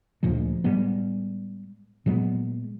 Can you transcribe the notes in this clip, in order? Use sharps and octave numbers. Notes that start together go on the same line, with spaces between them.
D2 A#2 F3 G#3
A2 G3 G#3 B3
A#2 F#3 G#3 B3